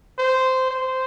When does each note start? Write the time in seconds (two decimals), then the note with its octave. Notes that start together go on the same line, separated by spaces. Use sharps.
0.18 C5
0.71 C5